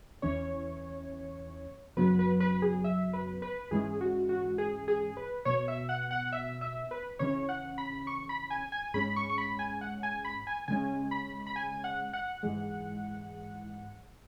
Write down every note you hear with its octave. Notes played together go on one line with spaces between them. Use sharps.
E2 E3 C#4 C#5
F#2 C#3 F#3 B3 B4
B4
B4
G#4
E5
B4
B4
G#2 E3 G#3 C#4 G#4
F#4
F#4
G#4
G#4
B4
B2 B3 C#5
E5
F#5
F#5
E5
E5
B4
C#3 E3 C#4 C#5
F#5
B5
C#6
B5
G#5
G#5
G#2 G#3 C#4 B5
C#6
C#6
B5
G#5
F#5
G#5
B5
G#5
C#3 G#3 C#4 G#5
B5
B5
G#5
F#5
F#5
G#2 E3 G#3